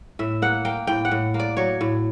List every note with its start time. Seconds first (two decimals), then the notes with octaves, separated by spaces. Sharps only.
0.19 A2 E5
0.42 A#3 F#5
0.65 A#3 G5
0.87 A2 G5
1.05 F#5
1.11 A2
1.34 A#3
1.39 D5
1.57 F#3 C#5
1.81 A2